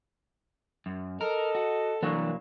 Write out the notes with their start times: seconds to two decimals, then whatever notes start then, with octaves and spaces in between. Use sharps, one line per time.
0.86 F#2
1.21 A4 A#4 D#5
1.55 F#4
2.03 C2 E3 F#3 A#3 D4